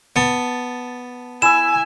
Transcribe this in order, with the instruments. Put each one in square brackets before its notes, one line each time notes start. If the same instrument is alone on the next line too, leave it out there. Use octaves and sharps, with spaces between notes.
[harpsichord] B3 [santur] A5
[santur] E4 E5 [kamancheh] G#5 [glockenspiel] E7